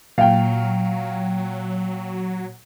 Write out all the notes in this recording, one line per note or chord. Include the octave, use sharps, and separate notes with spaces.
A#2 F#3 F5 G5